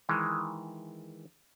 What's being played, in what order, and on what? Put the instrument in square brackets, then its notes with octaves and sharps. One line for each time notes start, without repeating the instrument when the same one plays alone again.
[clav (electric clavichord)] D#3 E3 G#3